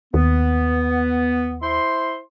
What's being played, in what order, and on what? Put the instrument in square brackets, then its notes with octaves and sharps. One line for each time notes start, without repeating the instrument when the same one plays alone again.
[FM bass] D#2 [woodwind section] B3
[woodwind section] E4 C5 C6